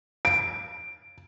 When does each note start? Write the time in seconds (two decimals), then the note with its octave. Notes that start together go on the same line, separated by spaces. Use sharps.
0.25 D7